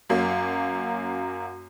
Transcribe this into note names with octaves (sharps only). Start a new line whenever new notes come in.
F#2 F#3 A#3